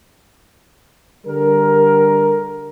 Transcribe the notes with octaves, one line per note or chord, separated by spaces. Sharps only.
D3 G3 A#4